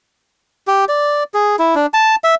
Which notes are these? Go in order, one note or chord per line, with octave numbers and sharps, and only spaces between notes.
G4
D5
G#4
E4
D4
A5
E5